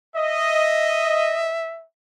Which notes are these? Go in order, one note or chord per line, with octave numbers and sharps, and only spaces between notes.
D#5 E5